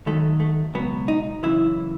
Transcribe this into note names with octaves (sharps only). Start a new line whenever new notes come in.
D#2 D#3 F#3 A3
A3
C#2 B2 F#3 B3
D#4
F#2 C#3 E3 E4